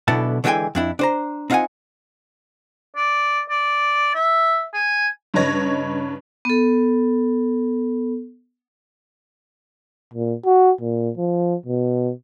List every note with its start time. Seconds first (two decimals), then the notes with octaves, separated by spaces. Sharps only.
0.08 B1 B2 D3 B3 E4 A5
0.44 D3 E3 G#3 D4 G5 G#5
0.75 F2 D4 E4
0.99 D4 C5 A#5
1.50 C4 D#4 F4 F5 F#5 G#5
2.96 D5
3.50 D5
4.15 E5
4.74 G#5
5.34 G2 C#3 D#4 B4 C#5 A#6
6.45 B3 A4
10.14 A#2
10.45 F#4
10.81 A#2
11.17 F3
11.66 B2